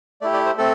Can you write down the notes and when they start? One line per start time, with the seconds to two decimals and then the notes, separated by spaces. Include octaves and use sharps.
0.21 A3 E4 G4 D5
0.34 D5
0.46 C5
0.58 A3 C4 A4